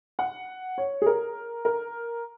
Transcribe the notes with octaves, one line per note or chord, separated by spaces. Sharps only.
F#5
C#5
G#4
A#4
A#4